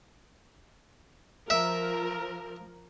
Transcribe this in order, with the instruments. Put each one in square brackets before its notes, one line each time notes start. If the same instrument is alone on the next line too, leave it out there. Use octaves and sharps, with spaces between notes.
[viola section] F3 A#4 [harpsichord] E5